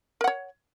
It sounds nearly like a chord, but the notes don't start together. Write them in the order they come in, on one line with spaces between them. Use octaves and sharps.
A#4 F#5 C#5